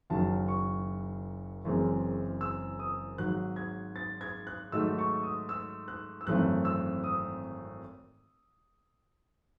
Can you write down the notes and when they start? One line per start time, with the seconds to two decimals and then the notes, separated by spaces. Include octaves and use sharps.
0.10 F#1 F#2 D#3 F#3 A5
0.48 C#6
1.64 F#1 F#2 E3 G#3 C4
2.41 E6
2.79 D#6
3.18 G#1 G#2 D#3 F#3 F#6
3.56 G#6
3.96 A6
4.21 G#6
4.47 F#6
4.72 G#2 D#3 F#3 A3 D#4 E6
4.99 C#6
5.23 D#6
5.49 E6
5.88 F#6
6.21 E6
6.27 G#1 F#2 E3 A3 C4 F#6
6.65 E6
7.04 D#6